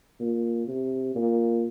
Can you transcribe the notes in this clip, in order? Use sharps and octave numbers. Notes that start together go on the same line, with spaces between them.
A#2
C3
A#2